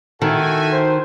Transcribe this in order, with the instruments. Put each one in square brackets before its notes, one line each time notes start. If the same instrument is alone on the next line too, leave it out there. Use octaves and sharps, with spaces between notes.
[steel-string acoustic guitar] D#3 [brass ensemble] F#4 E5 G#5 [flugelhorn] A4
[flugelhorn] C5